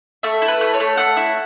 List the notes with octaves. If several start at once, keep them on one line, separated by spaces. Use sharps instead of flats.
A3 E5
E4
B4
A3
C#5
A3
A3 F#5
E4